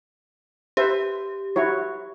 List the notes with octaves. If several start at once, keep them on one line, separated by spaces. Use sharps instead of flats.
G4 B4 C5 E5
E4 F#4 C#5